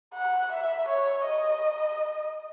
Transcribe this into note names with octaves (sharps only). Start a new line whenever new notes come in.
F#5
E5
C#5
D#5